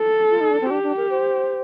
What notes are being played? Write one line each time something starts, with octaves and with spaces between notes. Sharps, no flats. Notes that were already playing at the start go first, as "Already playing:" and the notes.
Already playing: A4
F4
D#4
D4
C4
D4 G4
D4
A#4
C5